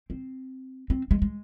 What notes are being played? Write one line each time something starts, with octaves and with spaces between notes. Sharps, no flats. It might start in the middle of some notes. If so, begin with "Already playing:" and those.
C4
C4
G#3
G#3